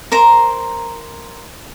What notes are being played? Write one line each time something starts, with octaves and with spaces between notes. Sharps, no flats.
A#4 C5 A#5